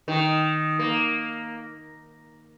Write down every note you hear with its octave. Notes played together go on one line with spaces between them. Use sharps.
D#3
A#3